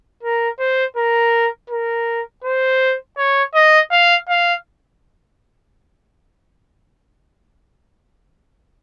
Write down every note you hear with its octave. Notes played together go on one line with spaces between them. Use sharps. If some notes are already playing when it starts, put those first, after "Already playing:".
A#4
C5
A#4
A#4
C5
C#5
D#5
F5
F5